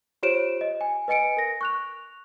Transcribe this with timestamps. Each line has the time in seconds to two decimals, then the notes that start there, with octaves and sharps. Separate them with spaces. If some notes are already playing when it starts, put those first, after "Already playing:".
0.23 F4 G4 C5 C#5 D7 E7
0.61 D#5
0.81 G#5
1.08 B4 D#5 G#5 C#7 D7
1.37 A#4 A#6
1.61 C#6 F#6 F7